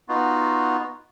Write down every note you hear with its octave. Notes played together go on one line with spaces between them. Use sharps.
B3 D#4 F4 F#4